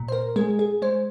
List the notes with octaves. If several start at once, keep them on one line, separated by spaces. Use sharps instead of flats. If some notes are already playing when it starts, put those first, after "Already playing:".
Already playing: A#2
C5
A#4
G#3 G#4
G#4
G#3 C5